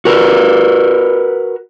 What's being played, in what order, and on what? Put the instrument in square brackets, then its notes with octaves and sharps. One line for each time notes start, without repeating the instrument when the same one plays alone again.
[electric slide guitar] F#4 A#4 B4